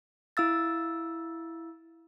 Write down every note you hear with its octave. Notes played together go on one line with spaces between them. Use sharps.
E4 F5 E6 A6